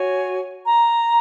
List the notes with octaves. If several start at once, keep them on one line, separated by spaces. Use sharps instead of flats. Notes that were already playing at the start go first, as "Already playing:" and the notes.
Already playing: F#4 C#5 G#5
A#5